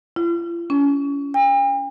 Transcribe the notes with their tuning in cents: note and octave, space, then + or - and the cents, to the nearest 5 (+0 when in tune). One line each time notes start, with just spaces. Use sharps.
F4 -45
C#4 +30
G5 +45